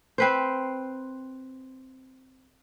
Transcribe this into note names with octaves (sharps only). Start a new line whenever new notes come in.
C4 B4 C5